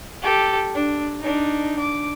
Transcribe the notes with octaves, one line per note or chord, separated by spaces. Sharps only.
G4 A4
D4
D4 D#4
D6